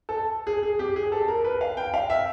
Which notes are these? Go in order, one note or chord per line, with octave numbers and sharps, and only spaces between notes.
A4
G#4
G#4
G4
G#4
A4
A#4
B4
F5
G5
F5
E5